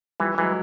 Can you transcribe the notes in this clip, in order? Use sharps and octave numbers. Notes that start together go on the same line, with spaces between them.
E3 F3 G3
E3 F#3 G#3